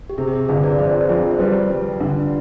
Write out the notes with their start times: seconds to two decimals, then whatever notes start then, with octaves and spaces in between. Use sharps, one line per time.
0.10 G4
0.18 C3 G#4
0.28 G4
0.33 G#4
0.48 G1 G#4
0.63 B4 D5
0.79 F2 G#4 C5
1.09 F2 G#4
1.31 C5
1.39 G3 G4 B4
1.70 G3
2.00 D3